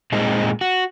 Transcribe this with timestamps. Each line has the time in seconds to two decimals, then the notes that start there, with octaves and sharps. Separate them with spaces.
0.12 A#2 G#3 C4 D#4
0.61 F#4